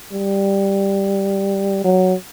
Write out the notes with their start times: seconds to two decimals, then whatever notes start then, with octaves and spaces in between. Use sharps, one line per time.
0.12 G3
1.84 F#3